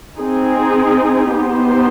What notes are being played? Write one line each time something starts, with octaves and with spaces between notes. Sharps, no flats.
C4 D#4 G#4
B3 D#4 G4 C5